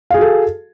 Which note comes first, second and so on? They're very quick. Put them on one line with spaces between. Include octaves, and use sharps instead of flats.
F5 G#4 F#4 A4